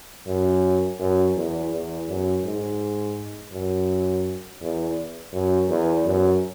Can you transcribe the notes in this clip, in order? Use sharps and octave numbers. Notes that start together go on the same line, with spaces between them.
F#2
F#2
E2
E2
F#2
G#2
F#2
E2
F#2
E2
F#2